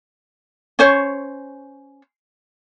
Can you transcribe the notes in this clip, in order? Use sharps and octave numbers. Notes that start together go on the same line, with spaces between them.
C#4 C5 C#5